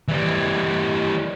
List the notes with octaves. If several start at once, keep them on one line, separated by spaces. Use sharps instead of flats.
E3 G3